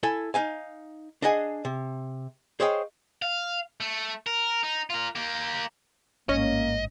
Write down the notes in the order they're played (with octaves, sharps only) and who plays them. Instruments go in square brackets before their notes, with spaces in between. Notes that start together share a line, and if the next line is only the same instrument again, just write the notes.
[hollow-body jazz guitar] E4 A4 G#5
D#4 F5 G#5
D4 G#4 D#5 F#5 G#5
C3
G#4 C5 C#5 D#5 F5 G5
[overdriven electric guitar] F5
A3
A#4
D#4
F4 A#4
A#3 G4
[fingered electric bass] A1 G#2 [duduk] A#3 [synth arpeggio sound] C#4 [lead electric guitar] D#5